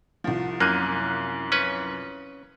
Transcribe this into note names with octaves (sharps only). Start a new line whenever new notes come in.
C2 F3
F#2 A#3 F#6 D#7
C#4 B4